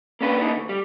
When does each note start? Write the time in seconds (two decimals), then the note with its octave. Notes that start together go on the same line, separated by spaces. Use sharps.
0.21 A#3 C#4 D4 B4
0.41 A#3 D#4 E4
0.57 D2
0.69 G3